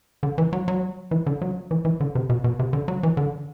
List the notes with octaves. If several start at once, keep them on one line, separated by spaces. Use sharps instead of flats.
D3
E3
F#3
F#3
E3
D3
F#3
E3
E3
D3
C3
B2
B2
C3
D3
F#3
E3
D3